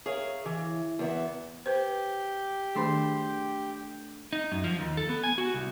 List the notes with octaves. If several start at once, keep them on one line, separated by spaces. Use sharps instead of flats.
G#4 A#4 C#5 E5 F5
E3
E2 B3 E5
G4 B4 C5
D#3 A3 D4 G#4 C6
D#4
F#2
F3
D#2
A4
B3
G#5
F#4
C2